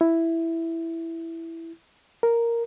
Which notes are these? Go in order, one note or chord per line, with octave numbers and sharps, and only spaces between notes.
E4
A#4